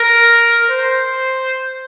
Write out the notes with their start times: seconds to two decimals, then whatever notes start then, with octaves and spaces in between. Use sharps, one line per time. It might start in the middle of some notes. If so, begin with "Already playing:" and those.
Already playing: A#4
0.70 C5